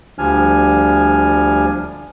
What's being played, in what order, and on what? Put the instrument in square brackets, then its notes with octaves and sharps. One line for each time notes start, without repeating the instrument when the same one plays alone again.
[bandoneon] D2 F3 G3 D4 G#5 F6